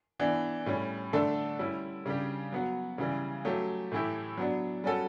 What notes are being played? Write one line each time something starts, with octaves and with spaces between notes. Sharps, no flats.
E3 B3 D4
A2 G3 C#4
D3 A3 D4 A4
G3 C#4 E4
C#3 G3 D4 G4
F#3 B3 F#4
C#3 E3 G3
F#3 A3 C#4 G4
A2 E3 A3 E4 G4
F#3 B3 D4
G3 C#4 F#4 A4